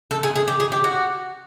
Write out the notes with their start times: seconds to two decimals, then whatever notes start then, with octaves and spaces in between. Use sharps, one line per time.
0.11 A4
0.23 G#4
0.36 G#4
0.48 G4
0.60 G#4
0.72 G4
0.84 F#4